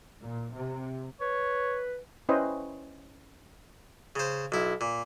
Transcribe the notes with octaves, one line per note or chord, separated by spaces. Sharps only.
A#2
C3
B4 C#5
C#4 E4 B4 C5 D#5 G5
C#3 C5
B1 E4
A#2